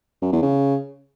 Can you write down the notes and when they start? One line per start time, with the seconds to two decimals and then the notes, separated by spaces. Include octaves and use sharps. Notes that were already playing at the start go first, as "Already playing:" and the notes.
0.22 F#2
0.32 E2
0.42 C#3